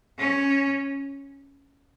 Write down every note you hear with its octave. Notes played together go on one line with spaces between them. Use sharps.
C#4